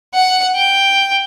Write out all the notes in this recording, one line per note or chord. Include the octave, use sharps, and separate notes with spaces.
F#5
G5